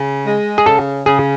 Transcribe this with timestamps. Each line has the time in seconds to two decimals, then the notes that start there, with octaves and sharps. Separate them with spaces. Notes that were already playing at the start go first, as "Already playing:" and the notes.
Already playing: C#3
0.26 G#3
0.58 G#4
0.66 C#3 A4
1.06 C#3 G#4